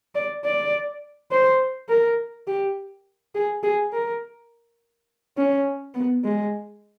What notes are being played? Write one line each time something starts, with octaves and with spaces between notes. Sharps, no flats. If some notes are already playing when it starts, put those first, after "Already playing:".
D5
D5
C5
A#4
G4
G#4
G#4
A#4
C#4
B3
G#3